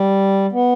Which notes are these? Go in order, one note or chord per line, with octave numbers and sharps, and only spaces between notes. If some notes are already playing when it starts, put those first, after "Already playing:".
Already playing: G3
B3